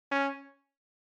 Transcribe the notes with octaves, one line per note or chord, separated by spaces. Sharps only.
C#4